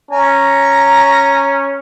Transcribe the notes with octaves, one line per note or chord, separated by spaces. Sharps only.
C#4 G#5 A#5